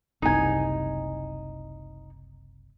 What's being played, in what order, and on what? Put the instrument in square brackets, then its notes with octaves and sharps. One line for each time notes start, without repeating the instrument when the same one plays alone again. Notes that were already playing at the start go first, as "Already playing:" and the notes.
[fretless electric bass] F#1 C2 [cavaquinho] D#4 G#5